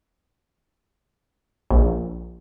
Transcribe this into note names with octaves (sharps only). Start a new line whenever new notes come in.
A#1